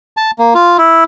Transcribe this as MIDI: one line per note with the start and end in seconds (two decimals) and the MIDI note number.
0.17 0.31 81
0.39 0.54 58
0.55 0.77 65
0.78 1.04 64